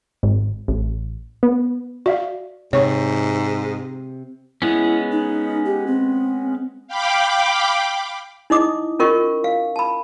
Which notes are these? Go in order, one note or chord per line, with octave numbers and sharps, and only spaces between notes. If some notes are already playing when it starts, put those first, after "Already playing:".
G#1
A1
B3
F#4 D5 E5 F5
G#2 C3 C#5 C#6
G#3 B3 C#4 E4
D#4
G4
C4
F5 G5 B5 D6
D#4 E4 D#5 D6 D#6
C#4 F4 A#4 D#5 C#6
F5
A5 B5